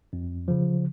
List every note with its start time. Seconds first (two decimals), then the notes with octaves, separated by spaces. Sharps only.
0.13 F2
0.48 C#3 F3